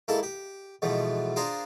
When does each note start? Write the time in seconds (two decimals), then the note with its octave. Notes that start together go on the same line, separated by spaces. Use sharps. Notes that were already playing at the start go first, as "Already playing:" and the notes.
0.08 G#2 A#3 E4 A4 A5
0.23 G4
0.82 G#2 B2 E3 F3 A3
1.36 D4 F4 G#4 A#4 C5